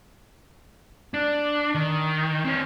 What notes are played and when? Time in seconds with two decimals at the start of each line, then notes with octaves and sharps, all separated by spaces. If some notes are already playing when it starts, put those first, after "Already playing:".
1.14 D4
1.75 D#3
2.44 C4 C#5